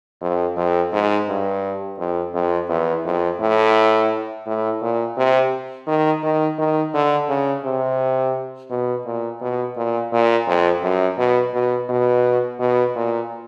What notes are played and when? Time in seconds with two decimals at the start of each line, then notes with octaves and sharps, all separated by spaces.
0.22 F2
0.57 F2
0.93 G#2
1.28 G2
1.99 F2
2.34 F2
2.69 E2
3.05 F2
3.40 A2
4.46 A2
4.82 A#2
5.17 C3
5.87 D#3
6.23 D#3
6.58 D#3
6.94 D3
7.29 C#3
7.65 C3
8.71 B2
9.06 A#2
9.42 B2
9.77 A#2
10.13 A#2
10.47 F2
10.83 F#2
11.18 B2
11.54 B2
11.90 B2
12.60 B2
12.96 A#2